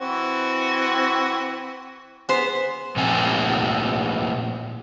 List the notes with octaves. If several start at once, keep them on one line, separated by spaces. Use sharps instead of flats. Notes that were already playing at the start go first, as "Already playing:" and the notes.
E3 C4 F#4
B3 G#4 C5
A#2 F3 A3 C4 A4 G#5